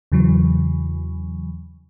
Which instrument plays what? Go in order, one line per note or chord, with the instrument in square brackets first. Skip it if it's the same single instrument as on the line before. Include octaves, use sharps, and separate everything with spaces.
[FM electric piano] E2 C#3 E3 F#3